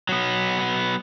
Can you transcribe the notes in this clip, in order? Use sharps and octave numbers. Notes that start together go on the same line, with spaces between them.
F#3 B3